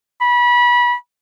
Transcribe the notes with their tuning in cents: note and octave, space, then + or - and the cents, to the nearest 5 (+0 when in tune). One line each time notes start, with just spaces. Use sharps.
B5 -25